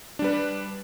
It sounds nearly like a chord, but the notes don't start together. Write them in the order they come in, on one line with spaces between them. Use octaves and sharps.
D4 G3 B4